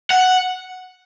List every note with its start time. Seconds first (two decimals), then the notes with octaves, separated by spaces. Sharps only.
0.10 F#5